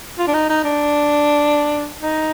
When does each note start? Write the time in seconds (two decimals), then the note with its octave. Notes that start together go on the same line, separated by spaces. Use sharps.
0.18 F4
0.27 D4
0.34 D#4
0.50 D#4
0.64 D4
2.02 D#4